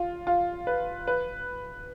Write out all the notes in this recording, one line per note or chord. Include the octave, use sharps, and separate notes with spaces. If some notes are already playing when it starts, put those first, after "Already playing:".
Already playing: F4
F4
B4
B4